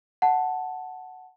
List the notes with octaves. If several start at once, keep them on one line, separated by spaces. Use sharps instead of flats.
F#5 A5